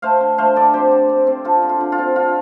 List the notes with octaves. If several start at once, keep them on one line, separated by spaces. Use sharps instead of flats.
A3 C5 F5
D3
A3 C5 F5
D3 A4 D5
C4 G4 C5
D3
C4
C4
D3 F4 A4
D3
F4
D3
F4
C4
D3 F4